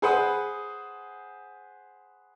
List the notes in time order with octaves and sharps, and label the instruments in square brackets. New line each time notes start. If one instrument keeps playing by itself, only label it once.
[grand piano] G#4 B4 C5 F#5 D#6